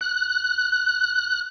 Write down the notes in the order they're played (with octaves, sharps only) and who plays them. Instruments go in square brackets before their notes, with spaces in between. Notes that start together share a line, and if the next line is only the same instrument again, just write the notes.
[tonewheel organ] F#6